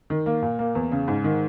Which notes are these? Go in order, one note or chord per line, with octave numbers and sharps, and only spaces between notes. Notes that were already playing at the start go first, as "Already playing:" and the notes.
D#3
A#3
A#2
A#3
E2
C#3
G#2
D#3